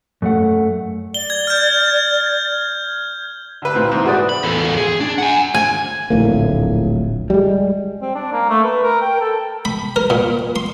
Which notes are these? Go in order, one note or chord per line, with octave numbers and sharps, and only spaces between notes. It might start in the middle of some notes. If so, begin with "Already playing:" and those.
F#2 A3 F#5
D5 G7
G#6
F6 G6
D3 B4
C2 A#2 C4
E2 G#2
F#4 G#4 B4 D5 D#6
B5
E2 A4
G#4
D4
F#5 G#5
G#5
D1 A#1 A2 A#3
G3 G#3
C4
D4
A#3
A3
B4
A#4
G5
A4
B5
A#4
A#2
C6